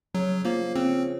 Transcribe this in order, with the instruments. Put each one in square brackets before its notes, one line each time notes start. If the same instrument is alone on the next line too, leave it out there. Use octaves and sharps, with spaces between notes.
[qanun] C#3 [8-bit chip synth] F#3
[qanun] F3 [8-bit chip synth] A#3
[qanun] C#3 [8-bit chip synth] C4